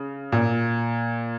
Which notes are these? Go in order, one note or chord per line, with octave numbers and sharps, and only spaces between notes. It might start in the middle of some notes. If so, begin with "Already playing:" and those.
Already playing: C#3
A#2